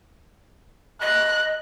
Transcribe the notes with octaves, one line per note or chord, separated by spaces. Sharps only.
D#5 F#6